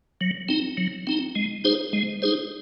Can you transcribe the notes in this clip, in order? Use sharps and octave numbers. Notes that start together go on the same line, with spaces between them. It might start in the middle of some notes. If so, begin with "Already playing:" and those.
F#3
C4 D#4
F#3
C4 D#4
G#3
D#4 G#4 C5
G#3
D#4 G#4 C5